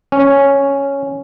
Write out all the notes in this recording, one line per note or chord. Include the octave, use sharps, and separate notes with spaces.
C#4